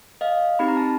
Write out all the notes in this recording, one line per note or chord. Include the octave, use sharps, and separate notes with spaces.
D#5 F5
C4 D#4 G4 B5
A#5
A5